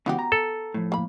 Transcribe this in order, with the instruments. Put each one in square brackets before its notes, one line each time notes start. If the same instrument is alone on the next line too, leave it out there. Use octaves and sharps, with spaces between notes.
[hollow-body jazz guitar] C#2 C#3 E3 [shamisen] B3 F#4 G4
[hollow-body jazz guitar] A#5
[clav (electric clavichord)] A4
[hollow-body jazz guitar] A2 F3
[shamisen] A#3 B5